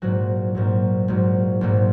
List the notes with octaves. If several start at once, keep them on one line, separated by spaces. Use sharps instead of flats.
A#1 G#2 F#3 F#4
A#1 G#2 F#3
A#1 G#2 F#3
A#1 G#2 F#3